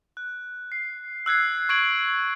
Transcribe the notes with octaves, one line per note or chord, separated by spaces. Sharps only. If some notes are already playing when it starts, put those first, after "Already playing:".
F#6
C7
E6 F#6 G#6 C7
C#6 G#6 D7 F#7